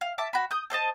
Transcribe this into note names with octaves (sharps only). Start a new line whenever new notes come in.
F5
E5 A5 D6
F#4 B5
D#6 G6
A4 C5 D#5 A5